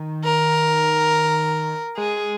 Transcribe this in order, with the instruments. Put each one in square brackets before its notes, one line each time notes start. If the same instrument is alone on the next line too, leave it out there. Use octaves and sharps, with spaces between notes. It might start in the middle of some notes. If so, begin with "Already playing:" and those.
Already playing: [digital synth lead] D#3
[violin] A#4
[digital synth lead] G#3 [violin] G#4